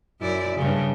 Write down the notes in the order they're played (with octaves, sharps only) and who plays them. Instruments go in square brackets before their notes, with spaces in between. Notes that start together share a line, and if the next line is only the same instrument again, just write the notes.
[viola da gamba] F#2 E4 D5
G2 C#3